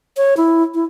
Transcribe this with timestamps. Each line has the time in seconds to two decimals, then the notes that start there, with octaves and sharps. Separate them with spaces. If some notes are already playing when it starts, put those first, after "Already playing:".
0.17 C#5
0.37 E4
0.75 E4